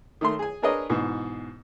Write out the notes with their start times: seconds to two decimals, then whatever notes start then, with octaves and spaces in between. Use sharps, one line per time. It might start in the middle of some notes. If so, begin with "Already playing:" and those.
0.21 D#3 A3 C6
0.39 G#4 G#5
0.62 D4 G#4 A#4 B4 C#5 D#5
0.90 G#2 B2 E3